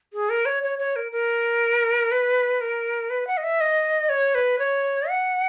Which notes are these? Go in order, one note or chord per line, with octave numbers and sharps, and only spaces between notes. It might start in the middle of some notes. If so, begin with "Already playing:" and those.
G#4
A#4
C#5
C#5
C#5
A#4
A#4
B4
A#4
B4
F#5
D#5
E5
D#5
C#5
B4
C#5
F#5